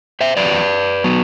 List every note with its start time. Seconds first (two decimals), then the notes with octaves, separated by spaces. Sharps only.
0.21 C5 E5
0.37 E2 C3 F#3 B4 D5
1.04 F#3 B3